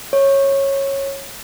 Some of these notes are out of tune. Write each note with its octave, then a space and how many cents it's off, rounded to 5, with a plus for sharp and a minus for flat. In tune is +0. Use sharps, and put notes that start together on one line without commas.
C#5 -15